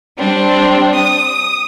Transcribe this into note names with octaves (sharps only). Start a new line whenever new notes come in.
G3 C4 D4
D#6